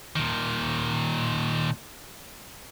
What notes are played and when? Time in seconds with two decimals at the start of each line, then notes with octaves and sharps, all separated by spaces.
0.16 A#2 D#3